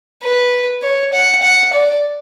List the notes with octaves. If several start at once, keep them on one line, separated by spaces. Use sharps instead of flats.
B4
C#5
F#5
F#5
D5